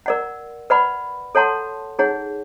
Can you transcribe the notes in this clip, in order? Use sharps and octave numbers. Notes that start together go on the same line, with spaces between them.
A#4 D5 F#5
B4 D5 F#5 B5
A4 C#5 F#5 A5 C6
D#4 G#4 C#5 F#5